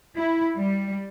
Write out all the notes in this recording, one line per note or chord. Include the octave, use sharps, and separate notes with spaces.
E4
G3